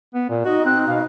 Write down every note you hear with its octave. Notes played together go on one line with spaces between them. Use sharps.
B3
A#2
D#4 F#4 D#5
C4 F#6
B2 F5